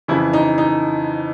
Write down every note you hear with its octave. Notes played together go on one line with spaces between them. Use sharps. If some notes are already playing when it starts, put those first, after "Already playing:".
F2 C#3 E3 E4
D#4
D#4